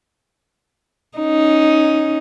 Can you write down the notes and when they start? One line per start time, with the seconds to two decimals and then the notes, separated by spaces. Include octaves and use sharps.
1.18 C#4 D#4